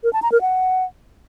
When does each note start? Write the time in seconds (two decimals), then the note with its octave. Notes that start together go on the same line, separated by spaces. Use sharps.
0.04 A#4
0.13 A5
0.22 A#5
0.32 A#4
0.41 F#5